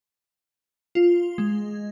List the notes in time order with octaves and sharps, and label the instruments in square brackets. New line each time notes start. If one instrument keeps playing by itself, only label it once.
[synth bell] F4
G#3